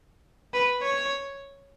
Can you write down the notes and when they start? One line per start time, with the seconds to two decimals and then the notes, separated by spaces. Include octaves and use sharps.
0.54 B4
0.82 C#5